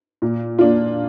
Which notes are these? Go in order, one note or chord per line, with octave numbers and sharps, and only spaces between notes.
A#2
A#3 D4 F4